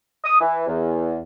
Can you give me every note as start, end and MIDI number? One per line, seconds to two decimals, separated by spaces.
0.24 0.40 87
0.40 0.64 52
0.67 1.18 40